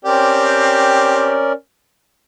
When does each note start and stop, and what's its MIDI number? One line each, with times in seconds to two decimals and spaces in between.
0.05 1.41 60
0.05 1.52 61
0.05 1.41 67
0.05 1.52 70
0.05 1.52 74